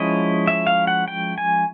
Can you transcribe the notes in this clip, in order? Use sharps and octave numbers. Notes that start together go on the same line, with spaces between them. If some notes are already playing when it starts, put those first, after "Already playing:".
Already playing: F3 G#3 C#4 E4 D#5
E5
F5
F#5
G5
G#5